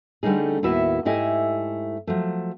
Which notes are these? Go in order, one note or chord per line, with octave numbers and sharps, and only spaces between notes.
D3 G3 A3 C#4 D#4 G#4
D#2 A2 B3 E4 F#4 E5
G#2 A3 E4 G4 D#5 G#5
F3 F#3 A3